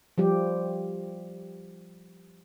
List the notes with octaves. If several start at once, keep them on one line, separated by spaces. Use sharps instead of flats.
F3 G3 G4